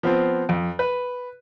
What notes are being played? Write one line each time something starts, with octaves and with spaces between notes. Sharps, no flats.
F3 B3 C4
F2
B4